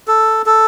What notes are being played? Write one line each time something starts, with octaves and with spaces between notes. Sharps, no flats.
A4
A4